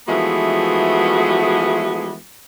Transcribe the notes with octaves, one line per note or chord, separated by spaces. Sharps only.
E3 F3 G#3 A3 B3 F#4